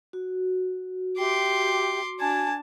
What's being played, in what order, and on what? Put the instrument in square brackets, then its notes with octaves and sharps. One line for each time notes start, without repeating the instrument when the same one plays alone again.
[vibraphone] F#4
[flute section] G4 E5 G5 [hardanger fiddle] C6 D6
[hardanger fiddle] D4 A5 [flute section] G#5 G#6